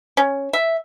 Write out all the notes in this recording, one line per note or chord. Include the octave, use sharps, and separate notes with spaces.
C#4
E5